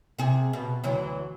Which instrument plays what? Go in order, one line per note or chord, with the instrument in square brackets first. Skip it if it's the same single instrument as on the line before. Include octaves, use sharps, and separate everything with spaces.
[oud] C3 G#4
B2
D2 E3 F#3